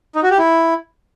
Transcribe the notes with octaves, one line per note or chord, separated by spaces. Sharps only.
D#4
F#4
G4
E4